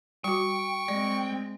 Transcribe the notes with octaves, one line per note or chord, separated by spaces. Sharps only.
G3 F#4 G5 C#6
G#3 C4 D5